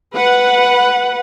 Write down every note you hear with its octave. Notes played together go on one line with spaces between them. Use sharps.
B4 F#5